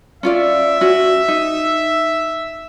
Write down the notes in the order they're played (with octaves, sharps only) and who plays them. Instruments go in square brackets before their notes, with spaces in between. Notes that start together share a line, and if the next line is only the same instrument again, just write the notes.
[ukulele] C#4 F4 D5 [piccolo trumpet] E5
[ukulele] C#4 F#4
D#4